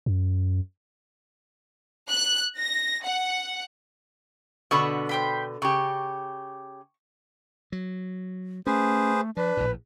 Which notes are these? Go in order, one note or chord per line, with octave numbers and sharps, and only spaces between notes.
F#2
F#6
A#6
F#5
B2 D3 F#5 B5 C#6
C5 G5 B5
C#3 G4 C#6
F#3
A3 C#4 G#4 B4 C5
F3 D4 B4
A#1 A2